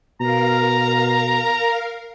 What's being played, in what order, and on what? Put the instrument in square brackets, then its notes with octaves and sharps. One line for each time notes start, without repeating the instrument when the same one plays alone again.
[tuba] B2 [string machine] A#4 F5 [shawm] A#5